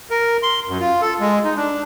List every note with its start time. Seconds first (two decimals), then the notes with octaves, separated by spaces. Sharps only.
0.10 A#4
0.43 C6
0.68 F#2
0.80 F4
1.01 A4
1.20 G#3
1.44 D#4
1.56 D4